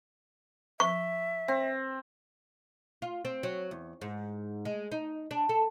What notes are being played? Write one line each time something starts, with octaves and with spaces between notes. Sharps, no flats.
E5 C#6
C4
F4
C4
F#3
E2
G#2
G#3
D#4
D4
A4